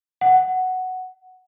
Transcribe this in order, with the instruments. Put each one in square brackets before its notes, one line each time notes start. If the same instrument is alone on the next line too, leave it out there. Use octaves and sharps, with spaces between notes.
[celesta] F#5